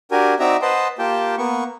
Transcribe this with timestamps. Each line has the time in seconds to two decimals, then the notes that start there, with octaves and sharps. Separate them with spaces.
0.11 D4 F#4 G4 A#4 G#5
0.39 C4 D#4 F#4 D5 E5 A#5
0.62 B4 C5 D#5 F#5 A5 C6
0.99 A#3 F4 G4 G5 A5
1.38 A#3 B3 C#6